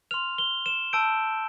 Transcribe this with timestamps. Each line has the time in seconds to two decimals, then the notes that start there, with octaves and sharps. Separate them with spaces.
0.11 C6 F6 F7
0.38 G7
0.66 E7
0.93 A5 E6 G6 D7